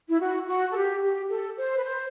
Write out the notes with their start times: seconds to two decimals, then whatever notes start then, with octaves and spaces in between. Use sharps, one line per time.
0.09 E4
0.20 F#4
0.47 F#4
0.71 A4
0.75 G4
1.03 G4
1.30 A4
1.57 C5
1.77 B4
1.84 C5